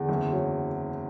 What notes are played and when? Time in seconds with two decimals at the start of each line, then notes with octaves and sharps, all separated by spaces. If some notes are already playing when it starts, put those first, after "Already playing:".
Already playing: E2 D3
0.09 F#1
0.32 F#3